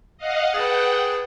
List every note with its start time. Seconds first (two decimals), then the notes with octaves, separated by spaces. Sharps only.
0.18 D#5 F5 F#5
0.54 G#4 B4 F#5 G5 A5